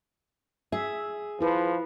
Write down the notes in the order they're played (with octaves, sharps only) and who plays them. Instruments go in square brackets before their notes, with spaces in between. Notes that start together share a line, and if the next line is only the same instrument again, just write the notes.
[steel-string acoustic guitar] G#4 [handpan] E5
[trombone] F3 [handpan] E4 B4